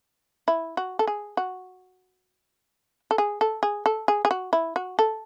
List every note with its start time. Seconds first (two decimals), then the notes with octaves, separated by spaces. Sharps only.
0.48 E4
0.77 F#4
0.99 A4
1.08 G#4
1.37 F#4
3.11 A4
3.18 G#4
3.41 A4
3.63 G#4
3.86 A4
4.08 G#4
4.25 G#4
4.31 F#4
4.53 E4
4.76 F#4
4.99 A4